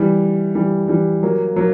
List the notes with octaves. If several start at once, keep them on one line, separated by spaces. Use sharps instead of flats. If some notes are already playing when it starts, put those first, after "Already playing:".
Already playing: E3 G3
E3 G3
E3 G3
F#3 A#3
F#3 A#3